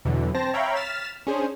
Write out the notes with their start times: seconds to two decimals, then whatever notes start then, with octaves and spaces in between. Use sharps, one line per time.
0.05 E2 B2 D3 E3 F#3
0.34 C4 C5 A5 A#6
0.54 C#5 E5 F5 G5 A#5 B5
0.76 F6 A6 B6 E7
1.27 C#4 D4 G#4 C5